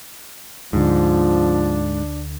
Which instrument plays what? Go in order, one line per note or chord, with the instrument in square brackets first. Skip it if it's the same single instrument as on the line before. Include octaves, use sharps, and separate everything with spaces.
[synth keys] D2 D3 [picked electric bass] G#2 [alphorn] F3 [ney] D4